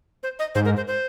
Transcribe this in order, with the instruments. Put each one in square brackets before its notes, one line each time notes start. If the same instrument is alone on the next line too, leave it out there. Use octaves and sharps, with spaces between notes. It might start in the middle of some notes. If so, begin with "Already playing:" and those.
[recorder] C5
D#5
[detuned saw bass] G#2 [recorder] C5
[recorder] A#4
C5
C5